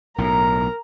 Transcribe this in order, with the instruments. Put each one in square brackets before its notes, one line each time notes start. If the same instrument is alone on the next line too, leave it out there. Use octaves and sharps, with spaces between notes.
[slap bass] B1 A2 [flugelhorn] A#4 [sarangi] A#5